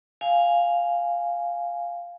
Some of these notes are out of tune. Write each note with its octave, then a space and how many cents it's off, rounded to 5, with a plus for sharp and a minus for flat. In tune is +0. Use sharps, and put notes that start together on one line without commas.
F5 +0 G#5 +0